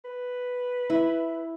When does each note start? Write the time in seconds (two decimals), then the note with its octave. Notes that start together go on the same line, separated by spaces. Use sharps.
0.05 B4
0.90 E4